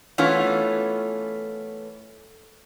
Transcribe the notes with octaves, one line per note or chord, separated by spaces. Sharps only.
E3 A3 B3 C#4 F4